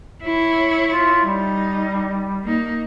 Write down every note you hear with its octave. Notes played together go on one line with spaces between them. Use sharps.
E4 C#5
F4
G3 D#4
A#3 D#4